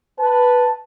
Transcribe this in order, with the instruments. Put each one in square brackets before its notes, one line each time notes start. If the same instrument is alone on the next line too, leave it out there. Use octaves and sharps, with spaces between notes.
[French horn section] B4 [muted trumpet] A5